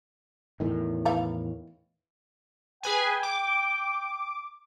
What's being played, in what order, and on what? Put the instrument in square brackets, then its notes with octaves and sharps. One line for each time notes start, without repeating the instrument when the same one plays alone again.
[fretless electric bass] E2 A2 D#3
[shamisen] E3 F5 A#5
[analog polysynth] G#4 B4 G#5 [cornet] G5
[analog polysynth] D6